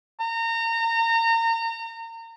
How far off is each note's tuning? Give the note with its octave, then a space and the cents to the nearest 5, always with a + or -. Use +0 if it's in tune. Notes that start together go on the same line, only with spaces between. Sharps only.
A#5 -30